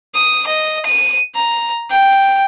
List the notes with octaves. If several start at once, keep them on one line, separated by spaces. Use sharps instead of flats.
D#6
D#5
D#7
A#5
G5